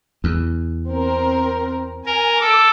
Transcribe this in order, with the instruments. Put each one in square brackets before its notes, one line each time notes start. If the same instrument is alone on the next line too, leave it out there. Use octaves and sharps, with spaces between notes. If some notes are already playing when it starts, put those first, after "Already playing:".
[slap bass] E2
[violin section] C4 A#4
[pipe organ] A#4 [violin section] G#5
[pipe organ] A4 [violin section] D6